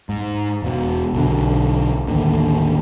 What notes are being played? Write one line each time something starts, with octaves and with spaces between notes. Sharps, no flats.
G#2
E1 B2
B1 D3
A1 D#2 D3